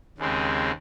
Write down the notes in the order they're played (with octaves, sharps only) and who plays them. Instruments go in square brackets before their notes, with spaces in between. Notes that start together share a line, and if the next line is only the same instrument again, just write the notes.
[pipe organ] D#2 C#3 G#3 C4